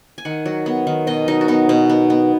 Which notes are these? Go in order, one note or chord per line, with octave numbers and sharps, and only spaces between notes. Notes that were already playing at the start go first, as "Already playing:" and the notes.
G#5
D#3 F#5
F#3
B3
D#3
B2 D#5
F#3 D#4
F#4
B3 D#4
B2
B3
B3